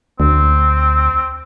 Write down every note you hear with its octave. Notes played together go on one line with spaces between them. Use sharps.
D2 C4